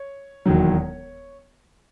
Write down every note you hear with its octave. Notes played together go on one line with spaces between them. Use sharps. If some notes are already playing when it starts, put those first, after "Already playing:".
Already playing: C#5
E1 D#2 D#3 F#3